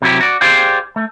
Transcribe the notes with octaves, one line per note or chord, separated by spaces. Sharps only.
C3 F#3 E4 G4
F#4 D5
G4 G#4 C5 D5 F5 G5
A3